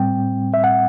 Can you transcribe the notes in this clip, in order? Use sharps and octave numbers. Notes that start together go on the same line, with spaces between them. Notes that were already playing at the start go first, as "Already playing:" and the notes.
Already playing: A2 G3 C4 G5
E5
F#5